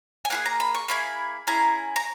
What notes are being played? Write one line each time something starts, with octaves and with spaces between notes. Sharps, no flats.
G#5
A#3 E4 G#4 F#5
A#5
B5
C#6
A#3 E4 G#4 B5
C#4 E4 G#4 A#5
A#5